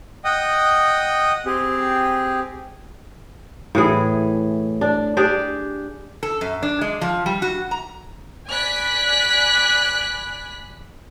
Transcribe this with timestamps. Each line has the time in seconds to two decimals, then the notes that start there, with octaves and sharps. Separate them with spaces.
0.24 D#5 F#5 G5 D#6
1.46 C4 G4 G#4
3.75 A2 E3 G#4
4.81 D4
5.17 D4 G4 G#4 D5
6.23 A4
6.41 F#2
6.63 D4
6.81 G#3
7.01 F3
7.26 G3
7.42 F#4
7.71 A#5
8.48 D5 G#5 B5 F#6 B6